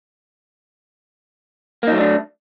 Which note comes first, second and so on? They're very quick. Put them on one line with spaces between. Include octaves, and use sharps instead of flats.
A#3 D#4 F#3 A3 D4